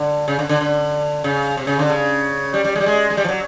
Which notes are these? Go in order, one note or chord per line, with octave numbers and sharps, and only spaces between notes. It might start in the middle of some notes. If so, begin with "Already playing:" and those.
Already playing: D3
C#3
D3
D3
D3
C#3
C3
C#3
D3
C#3
G3
G3
G#3
G3
G#3
G#3
G3
F3
F#3